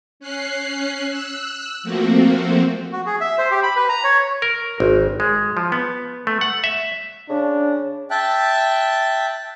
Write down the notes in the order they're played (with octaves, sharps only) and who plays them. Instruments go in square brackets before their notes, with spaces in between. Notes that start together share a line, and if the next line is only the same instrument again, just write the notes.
[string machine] C#4 F#6 C7
E6 F#6
F3 A3 A#3 C4 F#4
[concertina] F#4
G#4
E5
C5
G4
B5
B4
A#5
C#5
[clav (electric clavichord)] A#4
G#1
G#3
F3
B3
A3
F#5
E5
[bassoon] C#3 [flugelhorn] D4
[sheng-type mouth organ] E5 G5 A5 F#6